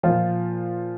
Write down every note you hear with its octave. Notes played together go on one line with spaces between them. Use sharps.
A#2 F3 F4